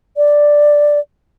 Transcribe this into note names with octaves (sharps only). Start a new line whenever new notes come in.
D5